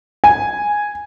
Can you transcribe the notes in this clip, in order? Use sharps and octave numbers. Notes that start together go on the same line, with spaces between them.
G#5